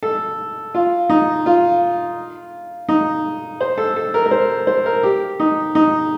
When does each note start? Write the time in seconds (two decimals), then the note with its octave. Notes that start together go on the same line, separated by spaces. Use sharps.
0.03 A4
0.75 F4
1.10 D#4
1.46 F4
2.89 D#4
3.61 C5
3.78 A4
3.96 A4
4.14 A#4
4.26 A#4
4.31 C5
4.67 C5
4.86 A#4
5.03 G4
5.40 D#4
5.75 D#4